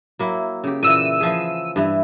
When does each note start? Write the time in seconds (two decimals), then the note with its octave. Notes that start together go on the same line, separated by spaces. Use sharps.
0.19 F#3 A#3 E4
0.64 C#3 G4
0.83 A#2 E3 E6 D#7
1.21 E3 F3 G#4
1.76 G2 E3 E4